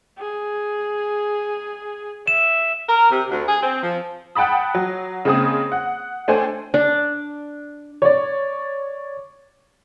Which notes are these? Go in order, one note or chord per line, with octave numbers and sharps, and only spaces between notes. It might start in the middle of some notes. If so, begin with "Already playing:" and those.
G#4
E5 E7
A#4
C3
D2
G#4
C4
F3
F#5 G5 A5 B5 D#6
F#3
C#3 G#3 A#3 C4 G#4 D#6
F#5
A3 D4 A4 C5 G5 G#5
D4
C#5 D5